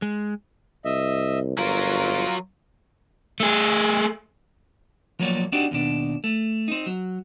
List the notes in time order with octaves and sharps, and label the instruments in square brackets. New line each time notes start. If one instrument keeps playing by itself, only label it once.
[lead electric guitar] G#3
[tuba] C2 [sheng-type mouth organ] D#5 E5
[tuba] G1 [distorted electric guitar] F#3 A#4 [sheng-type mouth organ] F4
[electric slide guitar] A3 G#4
[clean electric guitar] F3 F#3 A#3 C#5 D5
C4 D4 D#4 F#4 G4 D5
D#2 B2 D4
A3
C4 D#4
F#3